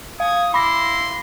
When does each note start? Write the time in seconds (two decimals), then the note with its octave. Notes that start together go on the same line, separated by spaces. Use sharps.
0.20 F5 D#6 G#6
0.54 E4 B5 C6 D6 A#6